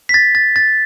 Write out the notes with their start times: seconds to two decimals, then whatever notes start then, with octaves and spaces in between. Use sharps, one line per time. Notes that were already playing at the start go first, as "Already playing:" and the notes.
0.09 B6
0.14 A6
0.35 A6
0.56 A6